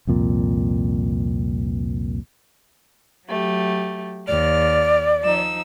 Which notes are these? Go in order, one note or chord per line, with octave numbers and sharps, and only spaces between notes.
C2 F2 A#2
F#3 A3 G4
D#2 D5 F6
F3 D#4 E6